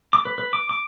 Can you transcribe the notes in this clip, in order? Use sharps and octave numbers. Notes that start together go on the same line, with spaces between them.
D6
B4
B4
D6
D6